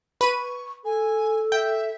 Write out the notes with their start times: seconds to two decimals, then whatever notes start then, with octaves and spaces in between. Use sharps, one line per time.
0.21 B4 C#6 D#7
0.85 A4 G#5
1.52 E5 G5